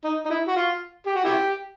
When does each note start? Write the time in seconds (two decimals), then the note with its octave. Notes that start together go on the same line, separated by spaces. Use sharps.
0.04 D#4
0.25 D#4
0.30 E4
0.48 F#4
0.56 F4
1.07 G4
1.15 F#4
1.24 E4 G4